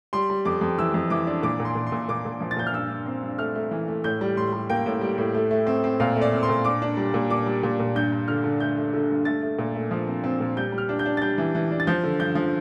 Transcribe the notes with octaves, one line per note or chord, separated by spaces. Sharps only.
G3 C6
G3
F2 D6
F2
E3 E6
F2
E3 D6
D4
A#2 D6
A#2
C6
A#2
C6
A#2
A#2 D6
A#2
F3
A6
A#2 G6
F6
G2 E6
G2
C4
G2
A3 F6
A3
E3
A3
A2 G6
G3
A2 C6
G3
A#3 G5
A2
G3
A2
A3
A3
C4
C4
A#2 F5
A3
D5
C4
C6
A#2
D4 D6
D4
G3
A#2
D4 D6
G3
A#2
A#2
G2 G6
G2
D3 F6
D3
A3 G6
A3
D3
G2
A3 A6
A3
A#2
A3
F3
C4
C4
A#2
G3 G6
G3
F6
D4
G6
D4
A6
G3 G6
E3
E3
D4
A6
F3 G6
D3
G2 G6
F3